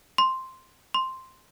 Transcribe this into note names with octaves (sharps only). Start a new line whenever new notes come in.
C6
C6